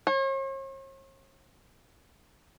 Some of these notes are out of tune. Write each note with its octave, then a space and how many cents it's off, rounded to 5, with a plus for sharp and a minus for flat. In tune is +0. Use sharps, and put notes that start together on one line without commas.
C#5 -45